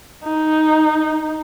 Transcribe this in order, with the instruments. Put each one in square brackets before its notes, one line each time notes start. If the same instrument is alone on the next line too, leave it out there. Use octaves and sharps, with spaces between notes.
[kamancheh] D#4